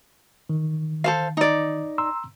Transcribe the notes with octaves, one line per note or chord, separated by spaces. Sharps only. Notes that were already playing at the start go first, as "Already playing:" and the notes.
D#3
A4 C5 F5
D#4 D5
A#5 C6 E6